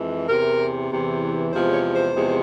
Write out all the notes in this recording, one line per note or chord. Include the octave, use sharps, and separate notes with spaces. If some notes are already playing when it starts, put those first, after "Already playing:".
Already playing: F2 E3 G#3
E2 C3 E3 A#4
E2 C3 E3
E2 C3 F3 G#3 C5
C#5
C5
E2 C3 F3 G#3